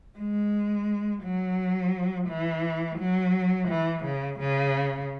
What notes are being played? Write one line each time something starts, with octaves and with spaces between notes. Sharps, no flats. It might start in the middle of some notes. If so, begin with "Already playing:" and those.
G#3
F#3
E3
F#3
E3
C#3
C#3